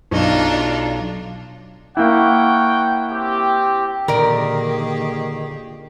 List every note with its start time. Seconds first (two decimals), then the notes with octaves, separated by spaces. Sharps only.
0.11 B1 D4 D#4 F4
1.97 A#3 E4 C#5 F#5 G5
3.11 C4 G4
4.08 A#2 D3 D#3 A#3 G4 G#4 A#4 D5